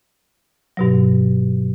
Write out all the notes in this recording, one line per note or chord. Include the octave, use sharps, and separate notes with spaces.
G2 B2 F#3